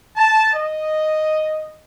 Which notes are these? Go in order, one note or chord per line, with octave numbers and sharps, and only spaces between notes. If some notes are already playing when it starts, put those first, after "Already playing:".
A5
D#5